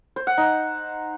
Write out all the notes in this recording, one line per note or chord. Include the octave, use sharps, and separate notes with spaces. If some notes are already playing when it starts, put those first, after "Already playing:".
C5
F#5
D#4